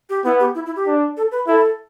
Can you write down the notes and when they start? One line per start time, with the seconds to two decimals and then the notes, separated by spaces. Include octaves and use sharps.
0.10 G4
0.25 B3 E4
0.40 G4
0.55 E4
0.66 E4
0.76 G4
0.87 D4
1.17 A4
1.32 B4
1.47 E4 A4